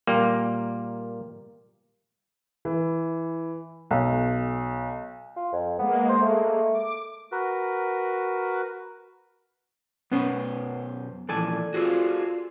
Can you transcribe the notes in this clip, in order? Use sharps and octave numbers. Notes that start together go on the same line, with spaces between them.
A#2 G3 A#3
E3
B1
F4
F2
G#3 A#3 B3
C5
A3
D6
F#4 A#4 B4
F#2 B2 B3 C#4 C5
A#2 E3 F3 A4 D5 G#5
F4 F#4 G#4 C5